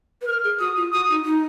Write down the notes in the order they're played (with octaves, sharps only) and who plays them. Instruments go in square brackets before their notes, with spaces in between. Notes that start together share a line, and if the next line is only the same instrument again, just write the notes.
[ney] B4
[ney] A#4 [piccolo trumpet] F6
[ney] G#4
[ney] F#4 [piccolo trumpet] D#6
[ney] F4
[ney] F#4 [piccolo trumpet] D#6
[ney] D#4
D#4